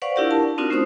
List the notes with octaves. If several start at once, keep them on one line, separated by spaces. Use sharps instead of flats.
B4 C5 D5 F5 F#5 C#6
D4 E4 F4 G4 A#4 D5
A#4 A5
C4 D4 D#4 F4 F#4 A#4
A3 C#4 F4 C5 D#6